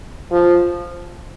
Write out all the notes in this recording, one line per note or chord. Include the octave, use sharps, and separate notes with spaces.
F3